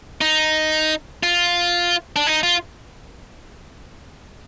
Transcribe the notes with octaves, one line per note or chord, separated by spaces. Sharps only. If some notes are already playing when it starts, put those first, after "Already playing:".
D#4
F4
D4
D#4
F4